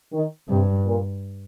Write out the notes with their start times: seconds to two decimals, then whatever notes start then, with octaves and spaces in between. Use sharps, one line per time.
0.13 D#3
0.49 G2 C3
0.86 A#2